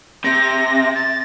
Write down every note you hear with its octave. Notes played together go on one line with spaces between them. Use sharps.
C3 A#6
A6